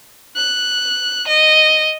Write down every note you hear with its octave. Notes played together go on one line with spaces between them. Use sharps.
F#6
D#5